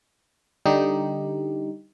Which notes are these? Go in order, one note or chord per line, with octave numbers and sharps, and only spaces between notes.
D3 G3 D#4 G4